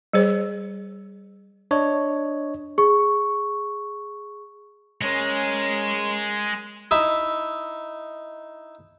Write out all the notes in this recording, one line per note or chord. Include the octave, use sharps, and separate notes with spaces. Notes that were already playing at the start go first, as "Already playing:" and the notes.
G3 G#4 C5 C#5
D4 C#5 D#5
G#4 C#6
G#3 C#4 A#4
D#4 E4 E5